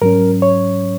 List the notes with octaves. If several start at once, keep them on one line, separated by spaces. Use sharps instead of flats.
G#2 F#3 C#4 A#4
C#5